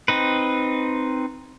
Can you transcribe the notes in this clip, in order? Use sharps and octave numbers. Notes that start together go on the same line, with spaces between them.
C4 D#4 B4